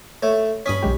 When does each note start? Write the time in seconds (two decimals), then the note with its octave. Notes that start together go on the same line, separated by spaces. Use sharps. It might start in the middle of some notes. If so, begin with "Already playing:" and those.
0.23 A3 C#5
0.66 G2 C#4 B5 D#6 B6
0.82 B1 G#3 G4